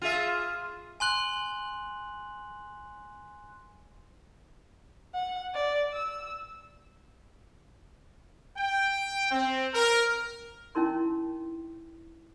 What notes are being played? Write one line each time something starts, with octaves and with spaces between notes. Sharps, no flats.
F4 G#4 E5
G#5 C6 F#6 F#7
F#5
D5
E6
G5
C4
A#4
C#4 D#4 E4 A#4 C6